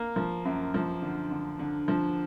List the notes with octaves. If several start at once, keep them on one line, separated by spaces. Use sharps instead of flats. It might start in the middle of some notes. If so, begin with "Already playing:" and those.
Already playing: A#3
F3
F#2
F3
D3
D3
D3
F3